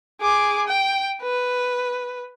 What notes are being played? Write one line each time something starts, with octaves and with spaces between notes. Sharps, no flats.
G#4 D6
G5
B4